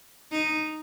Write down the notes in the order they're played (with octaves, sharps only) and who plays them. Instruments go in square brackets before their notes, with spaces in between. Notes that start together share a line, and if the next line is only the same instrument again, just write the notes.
[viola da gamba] D#4